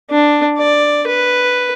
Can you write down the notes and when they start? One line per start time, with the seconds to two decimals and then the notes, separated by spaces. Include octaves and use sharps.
0.11 D4
0.58 D5
1.07 B4